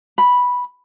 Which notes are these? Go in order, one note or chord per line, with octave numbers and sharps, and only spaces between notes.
B5